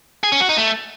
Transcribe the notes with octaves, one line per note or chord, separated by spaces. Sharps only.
G#4
C#4
F#4
D#4
A3